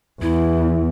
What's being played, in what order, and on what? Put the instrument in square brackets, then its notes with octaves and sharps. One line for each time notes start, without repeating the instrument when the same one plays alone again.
[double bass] E2 [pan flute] E4